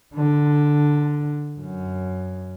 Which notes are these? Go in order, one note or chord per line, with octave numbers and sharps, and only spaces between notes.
D3
F#2